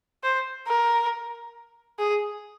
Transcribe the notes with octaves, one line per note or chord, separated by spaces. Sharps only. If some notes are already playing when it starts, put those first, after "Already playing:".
C5
A#4
G#4